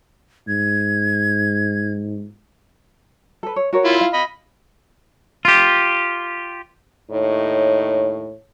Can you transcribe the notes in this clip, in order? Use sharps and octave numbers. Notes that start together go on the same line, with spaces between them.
G#2 G#6
A4 B4
C#5
F#4 A#4 C#5
E4 F4
F5
D#5 B5
F4 G4
D#2 A2 D#4 C#5